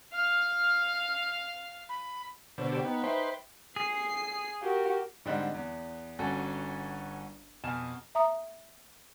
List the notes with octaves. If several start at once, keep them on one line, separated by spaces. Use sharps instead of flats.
F5 F6
B5
B2 D3 C5
G4 C5 G5
B3 D#4
B4 C5 E5 G5
G#4 C7
F#4 G4 A#4
G#2 D3 G3 C4 D#4 F#6
E2
G1 C#4 F#4 A4 G#5
F2 B2 G#5 F6 E7
E5 A#5 D#6